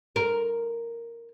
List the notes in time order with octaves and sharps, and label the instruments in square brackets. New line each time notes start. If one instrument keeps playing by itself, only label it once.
[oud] A#4